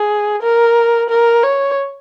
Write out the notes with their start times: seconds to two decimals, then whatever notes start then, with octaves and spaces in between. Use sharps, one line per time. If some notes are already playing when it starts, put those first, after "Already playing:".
Already playing: G#4
0.42 A#4
1.10 A#4
1.43 C#5